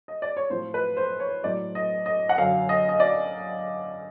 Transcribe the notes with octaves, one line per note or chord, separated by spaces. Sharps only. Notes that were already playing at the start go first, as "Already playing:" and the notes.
D#5
D5
C#5
A2 F3 C5
B4
C5
C#5
A2 F#3 D5
D#5
D#5
F#5
F#2 D3 F#3 F5
D#5
D#5
D5